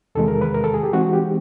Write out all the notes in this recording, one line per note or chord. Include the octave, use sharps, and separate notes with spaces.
E2 C3 D#3 G#3 A4
A#4
B4
A#4
A4
G#4
G4
E3 G#3 C4 D#4 F#4
G4